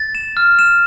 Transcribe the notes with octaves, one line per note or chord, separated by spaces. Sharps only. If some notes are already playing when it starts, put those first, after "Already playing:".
Already playing: A6
E7
F6
E7